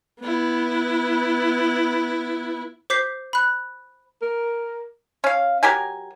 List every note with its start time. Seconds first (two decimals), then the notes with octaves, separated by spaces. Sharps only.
0.21 B3 E4
2.90 C5 D6 G6 B6 C7
3.33 B5 F#6
4.22 A#4
5.24 C#4 F5
5.63 F#3 G4 A#4 G#5